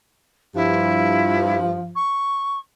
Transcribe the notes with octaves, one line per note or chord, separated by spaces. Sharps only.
G2 F3 E4
C#6